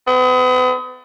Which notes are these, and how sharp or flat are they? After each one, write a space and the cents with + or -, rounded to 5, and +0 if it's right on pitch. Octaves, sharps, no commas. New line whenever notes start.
B3 +40